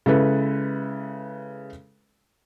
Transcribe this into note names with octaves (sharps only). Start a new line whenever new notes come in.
C#3 G#3 E4 A4 B4